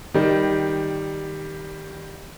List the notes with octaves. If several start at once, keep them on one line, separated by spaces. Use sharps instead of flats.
D#3 G3